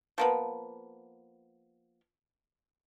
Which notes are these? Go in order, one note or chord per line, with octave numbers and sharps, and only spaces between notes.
F3 A#3 B3